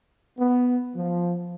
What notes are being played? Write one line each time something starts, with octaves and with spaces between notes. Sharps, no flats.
B3
F3